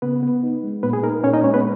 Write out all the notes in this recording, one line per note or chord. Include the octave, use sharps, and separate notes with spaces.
C#3 B3 B4
B3
D#4
G#3
A#2 B3 B4
G#4
D#4 A#4
A#2 C#4 C#5
D#4 D#5
G#3 C#4 C#5
B3 B4